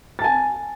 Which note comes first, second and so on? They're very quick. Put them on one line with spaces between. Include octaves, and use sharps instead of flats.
A6 A5 G#5